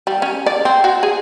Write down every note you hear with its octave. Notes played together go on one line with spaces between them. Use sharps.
G3
C#4
D5
C4
F#4
G#4